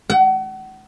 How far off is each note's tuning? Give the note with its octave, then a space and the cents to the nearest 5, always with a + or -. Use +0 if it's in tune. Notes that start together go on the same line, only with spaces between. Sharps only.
F#5 +35